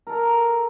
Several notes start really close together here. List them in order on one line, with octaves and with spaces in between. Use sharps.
A#4 A4 A#5